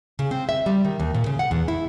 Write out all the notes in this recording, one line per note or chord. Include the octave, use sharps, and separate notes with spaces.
C#3
C4
E5
G3
D#3
D#2
A#2
C#3
F#5
E2
E4